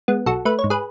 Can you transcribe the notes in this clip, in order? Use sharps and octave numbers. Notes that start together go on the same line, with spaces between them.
G#3 B3
B1 F#4 A4
A3 B4
C#5
G#2
G#4 B4